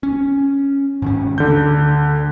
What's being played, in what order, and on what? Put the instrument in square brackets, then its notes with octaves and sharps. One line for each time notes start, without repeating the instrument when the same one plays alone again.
[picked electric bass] C#4
G#2 D#3 C#4
[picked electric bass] D2 [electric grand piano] D3 G6